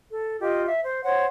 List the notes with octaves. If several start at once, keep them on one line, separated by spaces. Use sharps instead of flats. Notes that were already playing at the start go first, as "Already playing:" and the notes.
A4
F4 G4 D#5
E5
C5
C5 C#5 F#5